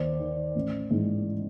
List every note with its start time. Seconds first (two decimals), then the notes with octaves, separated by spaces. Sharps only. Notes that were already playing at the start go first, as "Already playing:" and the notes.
Already playing: D#2 C5 D5
0.19 D#3
0.55 A1
0.91 G#2 E3